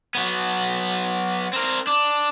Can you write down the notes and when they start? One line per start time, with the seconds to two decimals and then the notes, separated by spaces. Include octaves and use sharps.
0.15 F#3 B3
1.53 C4 A#4
1.87 D4